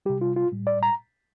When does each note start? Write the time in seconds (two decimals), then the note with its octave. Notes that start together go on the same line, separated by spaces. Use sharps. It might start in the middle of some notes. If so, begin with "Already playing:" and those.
0.05 C3 G3 G4
0.21 F4
0.36 F4
0.52 A2 G3
0.67 D5
0.83 A#5